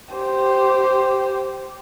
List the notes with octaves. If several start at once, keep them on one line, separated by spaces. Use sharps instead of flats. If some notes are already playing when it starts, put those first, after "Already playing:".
G4 C5